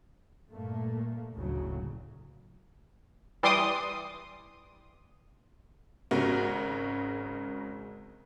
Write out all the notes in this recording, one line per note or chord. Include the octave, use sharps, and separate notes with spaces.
G2 A#2 A3 A#3
F#1 D2 A2 C#3 F#3
E3 G3 C6 D6 D#6
G#1 C#3 G#3 F#4 A#4